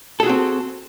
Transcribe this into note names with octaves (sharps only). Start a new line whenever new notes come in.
C4 F#4 G#4 A4